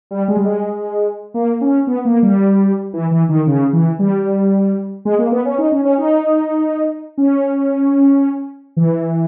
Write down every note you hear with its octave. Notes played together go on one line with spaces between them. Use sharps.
G3
G#3
G3
G#3
A#3
C#4
B3
A#3
G3
E3
E3
D#3
C#3
E3
G3
G#3
A#3
B3
C#4
D#4
C#4
C#4
D#4
C#4
E3